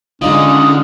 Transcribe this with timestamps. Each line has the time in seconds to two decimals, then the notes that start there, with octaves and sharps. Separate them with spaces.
0.22 D3 G#3 C#4 D#4 F4 D#6